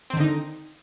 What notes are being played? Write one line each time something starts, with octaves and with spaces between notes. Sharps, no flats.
D3 D#3 C4 D#4